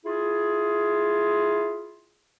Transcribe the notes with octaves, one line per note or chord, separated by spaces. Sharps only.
E4 F4 G#4